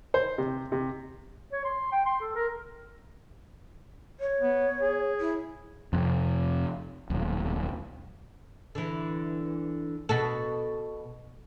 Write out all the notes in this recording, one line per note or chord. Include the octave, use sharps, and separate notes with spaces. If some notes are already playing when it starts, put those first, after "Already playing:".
C5
C3
C3
C#5
C6
G5
C6
A4
A#4
C#5
B3
G#4
E4
F2 C3
D#1 B1
D3 E3
B2 F#4 A4